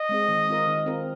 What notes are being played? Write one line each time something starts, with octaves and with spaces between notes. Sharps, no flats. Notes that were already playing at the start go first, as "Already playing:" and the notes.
Already playing: D#5
G#3 C4 G#4
D#3
C4 F4 A#4
D#3
C4 F4 A#4